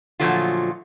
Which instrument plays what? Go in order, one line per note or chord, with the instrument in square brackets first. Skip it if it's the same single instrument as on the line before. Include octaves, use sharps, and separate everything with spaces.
[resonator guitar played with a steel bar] A#2 D3 F3 F#3 A3 F4